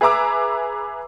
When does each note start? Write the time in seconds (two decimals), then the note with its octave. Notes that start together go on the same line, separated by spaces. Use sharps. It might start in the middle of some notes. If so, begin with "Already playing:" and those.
0.01 G#4 B4 E5 A#5 D6 E6